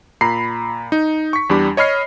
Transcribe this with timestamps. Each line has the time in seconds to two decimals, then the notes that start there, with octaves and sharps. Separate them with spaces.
0.21 A#2 A#5 B5 C7
0.92 D#4
1.33 C#6 B6
1.50 E2 G3 D4 G4 B5
1.77 C#5 D#5 B5 F6 C7